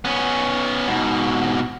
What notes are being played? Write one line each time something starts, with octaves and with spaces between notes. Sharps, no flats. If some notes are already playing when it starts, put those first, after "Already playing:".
B3 C#4
G#2 B2